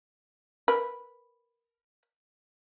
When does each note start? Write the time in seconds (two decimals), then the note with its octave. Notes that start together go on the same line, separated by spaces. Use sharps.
0.68 A#4 B4